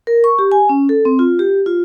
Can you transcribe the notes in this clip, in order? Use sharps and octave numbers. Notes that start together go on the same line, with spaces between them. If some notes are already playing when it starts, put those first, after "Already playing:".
A#4
C#6
G4
G#5
C#4
A4
C4
F4
G4
F4